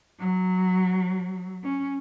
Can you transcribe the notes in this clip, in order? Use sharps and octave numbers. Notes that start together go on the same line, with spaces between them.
F#3
C#4